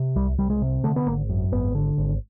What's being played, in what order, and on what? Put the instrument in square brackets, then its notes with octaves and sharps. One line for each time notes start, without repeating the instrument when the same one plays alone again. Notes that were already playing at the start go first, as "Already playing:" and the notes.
Already playing: [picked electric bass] C3
C2 G3
C2 G3
G#3
C3
D3 A3
B3
G#1 A#3
F#2
G#1 B3
D3
G#1